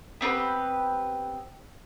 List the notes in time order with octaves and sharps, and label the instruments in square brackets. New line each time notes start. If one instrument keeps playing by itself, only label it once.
[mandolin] B3 C4 G4 B4